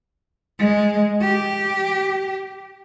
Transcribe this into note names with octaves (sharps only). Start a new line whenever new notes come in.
G#3
G4